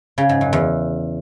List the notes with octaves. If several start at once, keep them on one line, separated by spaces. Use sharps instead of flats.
C#3
G#2
F#2
E2